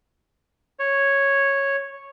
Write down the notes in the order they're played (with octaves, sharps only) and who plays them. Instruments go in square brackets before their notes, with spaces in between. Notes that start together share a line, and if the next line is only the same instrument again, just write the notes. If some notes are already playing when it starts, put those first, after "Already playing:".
[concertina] C#5